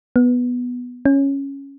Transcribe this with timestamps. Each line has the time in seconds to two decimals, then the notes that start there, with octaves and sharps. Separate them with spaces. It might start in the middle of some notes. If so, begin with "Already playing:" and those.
0.16 B3
1.05 C#4